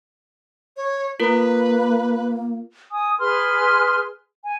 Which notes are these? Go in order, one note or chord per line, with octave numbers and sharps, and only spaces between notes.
C#5
A#3 F4 A#4 B4
G#5 D#6
G#4 B4 C6 F6
G#5